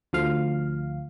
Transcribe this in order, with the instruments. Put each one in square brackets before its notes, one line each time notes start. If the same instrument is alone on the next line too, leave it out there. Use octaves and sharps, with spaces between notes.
[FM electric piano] D2 F3 F5